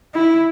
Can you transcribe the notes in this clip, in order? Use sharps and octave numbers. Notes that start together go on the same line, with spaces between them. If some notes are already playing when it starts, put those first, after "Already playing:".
E4